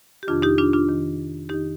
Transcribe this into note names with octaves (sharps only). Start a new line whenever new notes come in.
G4
F2 C3 D#3 D4 F4
D#4 G4
D4 F4
D4 F4
F2 D#3
F2 D#3 D#4 G4